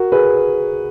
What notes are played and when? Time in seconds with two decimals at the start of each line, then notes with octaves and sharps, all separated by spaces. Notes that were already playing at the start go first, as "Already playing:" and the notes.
Already playing: F#4 A#4
0.12 G#4 B4